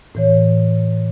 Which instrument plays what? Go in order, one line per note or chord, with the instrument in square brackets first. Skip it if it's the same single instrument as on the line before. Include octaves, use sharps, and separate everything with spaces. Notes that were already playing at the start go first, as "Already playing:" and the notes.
[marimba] A2 E3 C#5